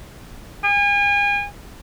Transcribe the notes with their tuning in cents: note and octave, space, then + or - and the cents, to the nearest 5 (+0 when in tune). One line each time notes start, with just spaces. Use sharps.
G#5 -40